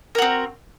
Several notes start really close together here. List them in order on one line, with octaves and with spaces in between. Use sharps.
A#4 F#4 C4